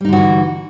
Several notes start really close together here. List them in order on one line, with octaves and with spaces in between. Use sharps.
G3 D#4 D3 F#4 E3